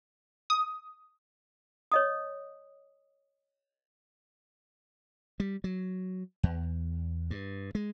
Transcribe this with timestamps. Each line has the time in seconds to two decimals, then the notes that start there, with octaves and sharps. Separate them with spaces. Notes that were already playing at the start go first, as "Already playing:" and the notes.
0.50 D#6
1.92 C#5 D#5 D#6
5.40 G3
5.64 F#3
6.43 E2
7.31 G2
7.75 G#3